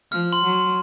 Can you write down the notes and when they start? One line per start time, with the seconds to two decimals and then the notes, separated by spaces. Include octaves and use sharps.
0.11 F3 F6
0.33 C6
0.43 F#3
0.53 C6